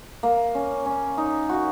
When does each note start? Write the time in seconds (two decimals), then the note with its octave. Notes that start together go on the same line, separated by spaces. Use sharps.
0.23 A#3
0.55 C#4
0.86 C#4
1.18 D#4
1.49 F#4